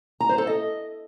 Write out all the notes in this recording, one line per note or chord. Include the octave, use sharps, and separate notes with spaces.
A#5
C5
A4
D#5